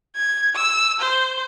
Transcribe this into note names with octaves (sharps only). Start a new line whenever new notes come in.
G#6
E6
C5